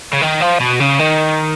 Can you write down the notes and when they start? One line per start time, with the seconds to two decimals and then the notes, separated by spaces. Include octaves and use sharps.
0.13 C#3
0.22 D#3
0.41 F3
0.60 B2
0.80 C#3
0.99 D#3